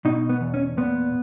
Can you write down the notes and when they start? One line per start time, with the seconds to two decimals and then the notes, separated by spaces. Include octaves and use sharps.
0.05 B2 D#4
0.29 B3
0.41 E2
0.54 C#4
0.77 A#2 B3